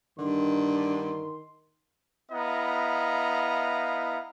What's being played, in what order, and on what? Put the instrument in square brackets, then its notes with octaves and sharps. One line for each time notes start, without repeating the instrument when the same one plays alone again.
[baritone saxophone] G2 [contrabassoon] D3 [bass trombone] D#3 [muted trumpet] C6
[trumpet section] B3 E4 D#5 F5 A#5